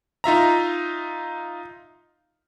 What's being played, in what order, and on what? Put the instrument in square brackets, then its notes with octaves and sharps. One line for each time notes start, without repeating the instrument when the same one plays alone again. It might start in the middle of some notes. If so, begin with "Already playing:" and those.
[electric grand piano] D#4 F4 E5 A#5